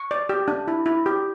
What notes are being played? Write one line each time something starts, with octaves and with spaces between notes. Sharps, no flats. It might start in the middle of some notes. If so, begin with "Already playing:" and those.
Already playing: C#6
D5
G4
D4
E4
E4
G4